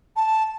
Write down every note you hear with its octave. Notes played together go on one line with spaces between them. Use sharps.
A5